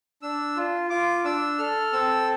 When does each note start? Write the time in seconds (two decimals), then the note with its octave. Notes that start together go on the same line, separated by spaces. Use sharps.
0.22 D4 E6
0.56 F4
0.90 F4 D6
1.24 D4 E6
1.58 A4 F6
1.93 C4 E6